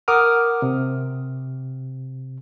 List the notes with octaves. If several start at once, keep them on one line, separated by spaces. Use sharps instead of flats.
A#4 F#5 D6 D#6 F6
C3